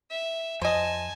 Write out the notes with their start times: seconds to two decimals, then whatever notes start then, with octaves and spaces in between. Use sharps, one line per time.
0.10 E5
0.62 F2 C5 D#5 G#5 A5